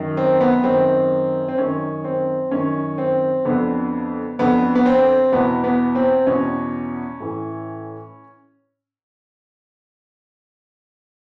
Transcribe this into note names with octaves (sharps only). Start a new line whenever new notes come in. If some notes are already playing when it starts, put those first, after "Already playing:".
Already playing: F#2 D#3
C4
B3
F#2 D#3 C4
C4
F#2 D#3 C#4
C4
F#2 D#3 C#4
C4
F2 D3 B3
F2 D3 B3
B3
C4
E2 B2 B3
B3
C4
E2 B2 C#4
A2 E3